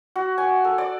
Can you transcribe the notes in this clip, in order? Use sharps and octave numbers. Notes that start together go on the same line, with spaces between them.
F#4
G#5
A4
D5